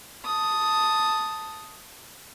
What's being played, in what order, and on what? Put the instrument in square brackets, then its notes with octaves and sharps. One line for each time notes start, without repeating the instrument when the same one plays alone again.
[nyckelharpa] A5 D#6